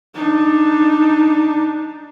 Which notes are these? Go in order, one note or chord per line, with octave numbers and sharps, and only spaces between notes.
D4 D#4